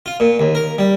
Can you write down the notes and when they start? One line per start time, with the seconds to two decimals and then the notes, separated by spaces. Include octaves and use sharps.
0.06 F4
0.20 A#2
0.40 D#2
0.55 A#4
0.78 G3